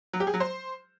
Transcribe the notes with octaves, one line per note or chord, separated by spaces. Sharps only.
F#3
G4
G#4
F#3
C5